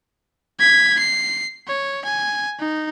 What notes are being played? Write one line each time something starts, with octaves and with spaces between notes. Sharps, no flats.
G#6 B6
C7
C#5
G#5
D#4